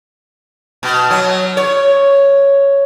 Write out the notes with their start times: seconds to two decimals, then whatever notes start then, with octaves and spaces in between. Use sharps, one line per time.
0.83 B2
1.10 F#3
1.57 C#5